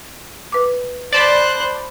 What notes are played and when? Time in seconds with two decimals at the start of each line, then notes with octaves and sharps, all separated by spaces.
0.52 B4 D6
1.13 C5 D5 A5 B5 F#6